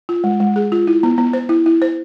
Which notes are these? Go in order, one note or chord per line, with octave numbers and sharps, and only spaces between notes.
F4
G#3
G#3
G#4
F4
E4
B3
B3
C5
E4
E4
C5